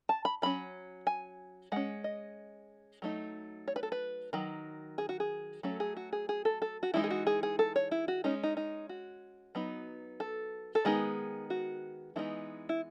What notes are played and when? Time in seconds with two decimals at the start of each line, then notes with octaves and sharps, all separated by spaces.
0.09 A5
0.25 B5
0.42 F#3 C#4 B5
1.07 G#5
1.72 G#3 C#4 F#5
2.04 D#5
3.02 F#3 A3 D#4
3.68 C#5
3.76 B4
3.83 A4
3.92 B4
4.33 D#3 F#3
4.98 G#4
5.09 F#4
5.20 G#4
5.63 F#3 A3 C#4 A4
5.80 G#4
5.97 F#4
6.13 G#4
6.29 G#4
6.45 A4
6.62 A4
6.83 F#4
6.94 E3 G#3 D#4 E4
7.04 G#4
7.10 F#4
7.27 G#4
7.43 G#4
7.59 A4
7.76 C#5
7.91 E4
8.08 F#4
8.24 G#3 C#4 D#4
8.43 D#4
8.57 D#4
8.89 F#4
9.55 F#3 B3 D#4
10.20 A4
10.75 A4
10.85 D#3 G#3 B3 D#4 G#4
11.50 F#4
12.16 E3 G#3 B3 D#4 E4
12.69 E4